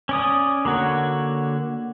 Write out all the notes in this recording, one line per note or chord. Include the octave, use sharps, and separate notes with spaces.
C#4 D5 D#6
D3 A#3 F#4 C#5